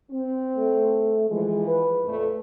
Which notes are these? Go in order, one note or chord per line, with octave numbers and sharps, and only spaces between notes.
C4
A3
E3 F3 G#3
B4
F2 A#2 A3